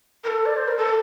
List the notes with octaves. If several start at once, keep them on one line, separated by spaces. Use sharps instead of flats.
A#4
A4
D5
C5
A#4
A4